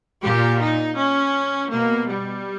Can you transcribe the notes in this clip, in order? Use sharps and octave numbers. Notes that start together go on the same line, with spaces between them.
A#2 G4
D#4
C#4
B2 A#3
G3